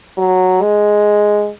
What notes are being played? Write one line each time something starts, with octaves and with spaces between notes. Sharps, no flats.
F#3
G#3